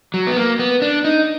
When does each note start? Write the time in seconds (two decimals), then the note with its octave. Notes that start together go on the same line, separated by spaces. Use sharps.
0.14 F#3
0.27 B3
0.37 A#3
0.59 B3
0.82 D4
1.04 D#4